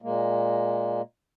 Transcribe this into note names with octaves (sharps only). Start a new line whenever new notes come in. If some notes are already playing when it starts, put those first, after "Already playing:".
A#2 G#3 A#3